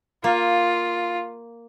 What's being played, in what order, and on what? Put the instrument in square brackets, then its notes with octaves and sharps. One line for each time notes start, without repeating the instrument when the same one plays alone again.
[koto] A#3 [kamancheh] F4